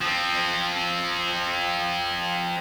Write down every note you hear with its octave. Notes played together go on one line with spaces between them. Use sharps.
F3 C4